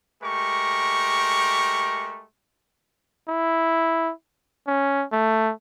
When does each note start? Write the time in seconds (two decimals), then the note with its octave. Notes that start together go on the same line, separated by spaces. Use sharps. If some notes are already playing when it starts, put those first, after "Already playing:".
0.22 G#3 A3 G4 A#4 C#6
3.28 E4
4.67 C#4
5.12 A3